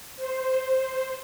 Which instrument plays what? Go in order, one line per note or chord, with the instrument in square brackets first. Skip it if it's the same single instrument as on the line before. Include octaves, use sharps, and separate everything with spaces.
[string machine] C5